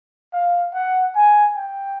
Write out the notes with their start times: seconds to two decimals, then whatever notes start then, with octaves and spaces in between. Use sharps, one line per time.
0.33 F5
0.74 F#5
1.15 G#5
1.56 G5